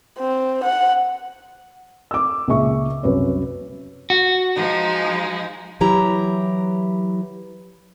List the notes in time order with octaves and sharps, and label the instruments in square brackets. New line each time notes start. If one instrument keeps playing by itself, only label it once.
[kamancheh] C4
F#5
[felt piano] D6 E6
C#2 A#2 G#4 E5 C#6
C2 F#2 B4 C#5
[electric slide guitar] F#4
[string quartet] F3 G#3 D#4
[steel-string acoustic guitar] E3 F#3 E4 G4 A#5